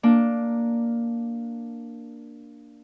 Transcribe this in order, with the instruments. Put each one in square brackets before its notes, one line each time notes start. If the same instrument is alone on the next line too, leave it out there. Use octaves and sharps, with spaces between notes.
[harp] A#3 D4